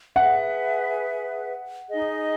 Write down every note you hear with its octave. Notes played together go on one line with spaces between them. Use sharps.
G#4 B4 E5 F#5
D#4 G#4 D#5